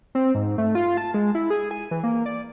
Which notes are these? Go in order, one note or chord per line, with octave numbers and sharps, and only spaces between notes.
C4
G#2
A3
F4
A5
G#3
E4
G#4
G#5
E3
A#3
D5